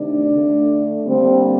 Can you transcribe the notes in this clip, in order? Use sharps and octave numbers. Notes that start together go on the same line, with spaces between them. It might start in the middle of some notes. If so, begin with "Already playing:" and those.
Already playing: C3 D#3 A3 D4
D3 A3
D3 G3 A#3 C4